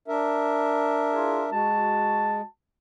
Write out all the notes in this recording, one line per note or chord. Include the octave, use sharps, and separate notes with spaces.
D4 A#4 E5
E4 F4 G#4
G#3 F#4 A5